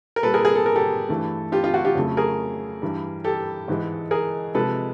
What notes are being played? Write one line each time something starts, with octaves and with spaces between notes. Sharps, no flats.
A#4
A#2 G3 A4 B4
G#4 A#4
G#4 A#4
A4
A#4
G4 A4
G2 E3 A3
F4 G4
F4
F#4
F4 G4
F2 C#3 F#3 A3
G#4 A#4
G2 E3 G3
G4 A4
G#2 E3 G#3
G#4 A#4
C3 F3 G#3 A4 B4